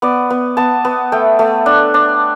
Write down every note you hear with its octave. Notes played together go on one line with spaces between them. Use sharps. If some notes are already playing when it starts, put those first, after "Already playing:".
B3 D5
B3
B3 A5
B3
A3 G5
A3
D4
D4